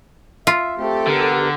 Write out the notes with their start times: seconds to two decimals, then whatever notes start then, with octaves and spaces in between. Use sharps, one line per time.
0.47 F4 E5
0.78 A3 C4 G4 A4
1.07 D3 B3 A#4